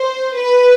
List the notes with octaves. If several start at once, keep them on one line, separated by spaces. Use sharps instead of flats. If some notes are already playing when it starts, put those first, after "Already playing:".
Already playing: C5
B4